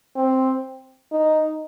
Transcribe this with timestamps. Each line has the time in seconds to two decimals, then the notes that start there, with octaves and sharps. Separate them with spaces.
0.16 C4
1.12 D#4